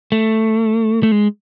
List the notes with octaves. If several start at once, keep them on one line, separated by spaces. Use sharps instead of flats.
A3
A3
G#3